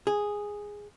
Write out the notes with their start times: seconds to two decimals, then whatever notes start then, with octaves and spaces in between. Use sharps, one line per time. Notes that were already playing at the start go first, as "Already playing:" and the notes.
0.07 G#4